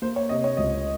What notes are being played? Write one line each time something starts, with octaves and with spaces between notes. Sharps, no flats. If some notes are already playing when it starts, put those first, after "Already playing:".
A#3 C5
C#5
C3 D#5
C#5
C#2 D#5